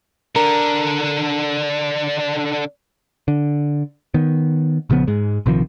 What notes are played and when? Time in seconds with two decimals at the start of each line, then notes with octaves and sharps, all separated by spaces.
0.36 D3 D4 A#4
3.28 D3
4.14 D#3 B3
4.90 A#1 C#3 F3 B3
5.07 G#2 G#3
5.46 A#1 C3 D#3 F3